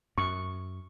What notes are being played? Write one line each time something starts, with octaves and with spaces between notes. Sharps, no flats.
F#2 C#6